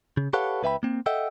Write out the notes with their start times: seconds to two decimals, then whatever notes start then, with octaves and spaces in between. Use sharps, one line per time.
0.17 C#3
0.33 G4 A4 B4 C#5 F5 F#5
0.63 C#2 B4 E5 G5 B5
0.83 A#3 C4
1.06 A4 D#5 E5 F#5 G5